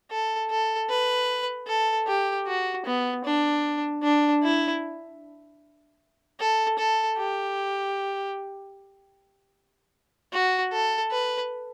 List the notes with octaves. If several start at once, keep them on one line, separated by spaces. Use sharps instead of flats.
A4
A4
B4
A4
G4
F#4
B3
D4
D4
E4
A4
A4
G4
F#4
A4
B4